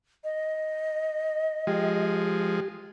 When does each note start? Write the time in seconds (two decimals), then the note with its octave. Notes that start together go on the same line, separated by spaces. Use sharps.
0.24 D#5
1.67 F3 G#3 G4